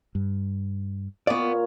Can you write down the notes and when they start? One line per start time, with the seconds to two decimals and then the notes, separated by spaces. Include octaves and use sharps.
0.15 G2
1.27 A#2 A#3 B3 C#5 D5